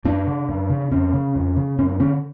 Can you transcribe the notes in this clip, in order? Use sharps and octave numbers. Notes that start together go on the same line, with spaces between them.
F#2 D4
C#3
F#2
C#3
F2 C#4
C#3
F2
C#3
F#2 C#4
D4
D3 C#4